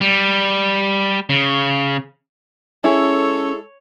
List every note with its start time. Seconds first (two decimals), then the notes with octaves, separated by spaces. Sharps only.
0.01 G3
1.30 C#3
2.84 G#3 C#4 E4 G#4 A4 C#5